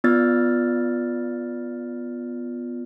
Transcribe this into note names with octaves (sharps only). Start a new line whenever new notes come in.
B3 F4 D5 F6 A6